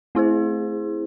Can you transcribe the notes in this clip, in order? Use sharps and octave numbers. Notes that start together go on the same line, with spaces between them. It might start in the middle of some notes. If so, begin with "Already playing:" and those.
A3 C4 E4 G#4 C5